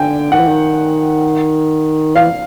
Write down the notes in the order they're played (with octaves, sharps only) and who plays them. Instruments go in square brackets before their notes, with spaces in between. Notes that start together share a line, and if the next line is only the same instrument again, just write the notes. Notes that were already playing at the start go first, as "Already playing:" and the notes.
Already playing: [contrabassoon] D3 [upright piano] G5 G#5
[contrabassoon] D#3 [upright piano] F#5
[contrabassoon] E3
D#3
[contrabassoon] E3 [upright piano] F5